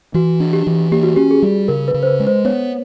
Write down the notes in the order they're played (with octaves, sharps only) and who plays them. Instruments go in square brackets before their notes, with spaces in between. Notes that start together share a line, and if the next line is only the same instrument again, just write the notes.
[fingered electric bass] E3 [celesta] F#4
[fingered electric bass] D4
[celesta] G4
[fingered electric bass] E3
[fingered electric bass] A#3 [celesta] G4
[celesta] F#4
[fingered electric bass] C#4 [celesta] G4
[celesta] G#4
[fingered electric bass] G3
[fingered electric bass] C#3 [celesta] A#4
[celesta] B4
[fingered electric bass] C#3
[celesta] C5
B4
[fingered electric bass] G#3
[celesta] C5
[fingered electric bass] B3 [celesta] C#5